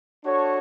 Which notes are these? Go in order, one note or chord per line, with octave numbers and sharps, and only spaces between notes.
D4 F#4 A4 C#5